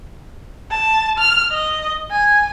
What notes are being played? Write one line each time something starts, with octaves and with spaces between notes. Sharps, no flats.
A5
F6
D#5
G#5